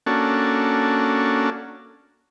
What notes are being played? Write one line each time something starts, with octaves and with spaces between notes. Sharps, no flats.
A#3 C#4 D4 F#4 A4